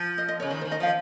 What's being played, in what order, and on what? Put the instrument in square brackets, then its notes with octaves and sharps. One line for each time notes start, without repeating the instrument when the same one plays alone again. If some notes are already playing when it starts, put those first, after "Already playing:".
Already playing: [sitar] F3
[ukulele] D#5
D#5
C#5
[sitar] C#3
[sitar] D#3 [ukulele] C5
[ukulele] C5
[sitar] D#3
[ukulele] D#5
[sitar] F3 [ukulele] F5